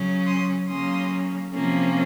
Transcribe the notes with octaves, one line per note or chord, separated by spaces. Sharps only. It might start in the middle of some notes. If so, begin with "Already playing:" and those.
Already playing: C#3 F#3 C#4
C6 D#6
C#3 F#3 A#3 C#4 C6 D#6
C3 F3 A#3 C#4